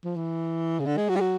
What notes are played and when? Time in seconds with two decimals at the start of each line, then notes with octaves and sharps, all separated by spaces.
0.05 F3
0.16 E3
0.80 C#3
0.86 D3
0.97 G#3
1.09 F#3
1.16 G3
1.20 F#3